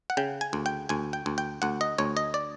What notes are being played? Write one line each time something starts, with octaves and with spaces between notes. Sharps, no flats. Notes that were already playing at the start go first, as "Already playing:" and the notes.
F#5
C#3 G5
G#5
D2
G5
D2 G#5
G5
D2
G5
D2 F#5
D#5
D2 C#5
D#5
D5